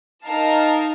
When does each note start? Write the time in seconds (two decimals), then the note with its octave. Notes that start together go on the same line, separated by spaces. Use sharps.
0.25 D#4 A#4 F5 A5